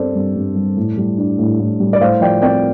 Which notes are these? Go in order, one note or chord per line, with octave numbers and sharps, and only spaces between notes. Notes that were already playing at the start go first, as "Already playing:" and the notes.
Already playing: G2 G3 C4 A4 C5 D5
G2
G2
G3
A2
G3
D4
A2
A2
G3
D5
A2 C5 F5
F3 D5 G5
C4 D5 G5